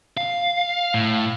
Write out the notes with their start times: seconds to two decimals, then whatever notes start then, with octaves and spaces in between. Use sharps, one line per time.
0.17 F5
0.94 A2